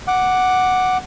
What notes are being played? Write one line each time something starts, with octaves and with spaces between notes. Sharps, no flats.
F#5 D6